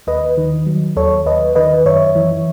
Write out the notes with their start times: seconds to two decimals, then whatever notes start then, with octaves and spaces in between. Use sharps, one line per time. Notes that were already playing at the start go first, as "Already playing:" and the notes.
0.07 D#2 B4 D#5
0.37 D#3
0.66 F#3
0.96 D#2 A4 C#5
1.26 D#2 B4 D#5
1.55 D#3 B4 D#5
1.85 F#2 C#5 E5
2.15 E3